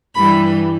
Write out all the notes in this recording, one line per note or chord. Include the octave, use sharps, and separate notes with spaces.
G2 E3 G3 B5